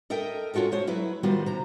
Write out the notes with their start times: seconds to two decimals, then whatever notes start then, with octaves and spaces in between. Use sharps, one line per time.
0.10 A4 A#4 D#5 E5 G5
0.54 C#4 F4 F#4 A4 A#4
0.72 G#3 C5 C#5
0.87 F#3 E4 B4
1.23 D#3 G3 B3 F4 F#4 C5
1.46 C3 A#5